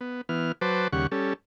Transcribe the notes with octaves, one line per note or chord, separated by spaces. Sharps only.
B3
E3 B3 F6
F#3 B4 C5 A5 D6
D#2 C#3 G3 F#5 C#6
G3 C#4 A4